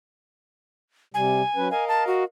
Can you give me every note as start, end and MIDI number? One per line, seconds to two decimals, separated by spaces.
1.14 1.42 48
1.14 1.42 55
1.14 1.71 80
1.56 1.69 54
1.56 1.69 61
1.56 1.69 71
1.71 2.24 70
1.71 2.24 75
1.71 2.24 77
1.71 1.85 80
1.88 2.07 81
2.07 2.24 66